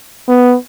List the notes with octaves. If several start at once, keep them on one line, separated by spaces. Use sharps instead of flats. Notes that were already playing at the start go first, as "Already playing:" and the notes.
B3